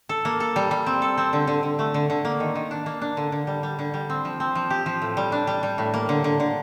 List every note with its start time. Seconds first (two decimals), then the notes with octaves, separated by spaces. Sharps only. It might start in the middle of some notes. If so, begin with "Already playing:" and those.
0.09 A4
0.25 A#3
0.40 A4
0.56 G3
0.71 G3
0.86 C4
1.02 A4
1.18 C4
1.33 D3
1.47 D3
1.63 D3
1.79 A3
1.94 D3
2.10 D3
2.25 A#3
2.40 D#3
2.55 D#3
2.71 D4
2.86 A#3
3.02 D4
3.17 D3
3.32 D3
3.47 G3
3.63 G3
3.79 D3
3.94 G3
4.10 C4
4.25 F3
4.40 C4
4.55 F3
4.70 G4
4.86 F3
5.02 A2
5.17 G3
5.32 D4
5.47 G3
5.63 G3
5.78 A2
5.94 A#3
6.09 D3
6.24 D3
6.40 D3